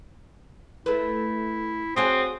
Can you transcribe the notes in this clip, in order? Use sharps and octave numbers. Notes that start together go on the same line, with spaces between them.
A3 E4 B4
C4 F#4 G#4 C#5 D#6